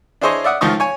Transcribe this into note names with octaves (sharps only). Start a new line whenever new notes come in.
D4 E4 G#4 C5 C#5 D#5
D5 E5 F#5 D#6
C#2 D#3 F3 D#4 C#6 D#6
C#5 G#5